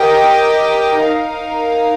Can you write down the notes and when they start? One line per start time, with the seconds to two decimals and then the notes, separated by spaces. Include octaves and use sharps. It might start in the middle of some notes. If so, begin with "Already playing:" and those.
Already playing: G4 A#4 D#5 G5
1.05 D#4 A#4 F5